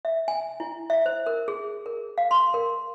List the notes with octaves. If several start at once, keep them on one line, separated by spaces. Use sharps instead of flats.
E5
G#5
E4
E5
C5
A#4
G#4
A#4
F5
C6
A#4